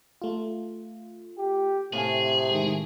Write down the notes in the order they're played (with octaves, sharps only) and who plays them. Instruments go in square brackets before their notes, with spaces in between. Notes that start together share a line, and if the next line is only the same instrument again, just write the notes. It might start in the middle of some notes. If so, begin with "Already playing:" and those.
[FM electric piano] A3 F4
[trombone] G4
[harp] A2 F5 G#5 [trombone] C3 [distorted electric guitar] G#4
[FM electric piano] D#3 G#3